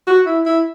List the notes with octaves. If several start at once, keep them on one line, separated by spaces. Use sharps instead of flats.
F#4
E4
E4